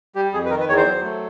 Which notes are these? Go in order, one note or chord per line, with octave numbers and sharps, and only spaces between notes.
G3 G4
F2 G#4
B4
D#3 A#4
B4
E2 C#5
C5
F#3
A3